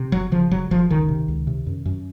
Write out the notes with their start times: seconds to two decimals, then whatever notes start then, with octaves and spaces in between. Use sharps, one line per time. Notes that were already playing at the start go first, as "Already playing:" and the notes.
Already playing: C3
0.12 F#1 F#3
0.32 C#3 F3
0.51 F#1 F#3
0.71 F#1 F3
0.89 C#2 D#3
1.09 C3
1.28 C#2
1.47 C3
1.66 F#2
1.86 F#2